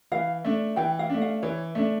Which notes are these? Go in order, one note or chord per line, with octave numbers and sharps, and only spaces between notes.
E3 F5
A3 D4
E3 G5
F5
A3 D4
F5
E3 C#5
A3 D4